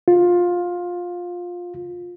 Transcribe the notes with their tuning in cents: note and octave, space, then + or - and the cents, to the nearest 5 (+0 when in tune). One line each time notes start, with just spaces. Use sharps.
F4 +15